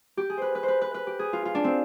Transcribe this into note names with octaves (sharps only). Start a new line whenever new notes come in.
G4
G#4
B4 C5
B4
C5
B4
B4
B4
G4
G#4
F4
F4
D4
C4